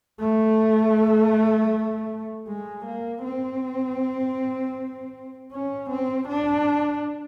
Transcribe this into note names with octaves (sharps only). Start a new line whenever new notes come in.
A3
G#3
A#3
C4
C#4
C4
D4